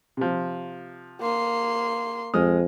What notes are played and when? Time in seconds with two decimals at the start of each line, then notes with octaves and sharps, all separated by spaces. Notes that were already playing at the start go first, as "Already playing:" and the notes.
0.17 C3 F3
1.21 A#3 C6
2.34 F2 G#3 D#6 F6